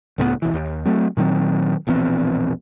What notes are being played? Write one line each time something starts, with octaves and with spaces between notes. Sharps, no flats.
C#2 A2 G3 B3
B1 E3
D#2
F#3 A3 C4
A#2 D#3 F#3 C4
E1 A#1 E2 C4